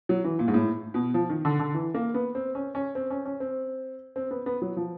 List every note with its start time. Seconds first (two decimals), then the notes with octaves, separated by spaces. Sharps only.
0.09 F#3
0.24 E3
0.39 A#2
0.48 G#2
0.54 A2
0.94 B2
1.14 F3
1.30 D#3
1.45 D3
1.59 D3
1.74 E3
1.94 A#3
2.14 B3
2.35 C4
2.55 C#4
2.75 C#4
2.95 C4
3.10 C#4
3.25 C#4
3.40 C4
4.16 C4
4.31 B3
4.46 B3
4.62 F#3
4.77 F3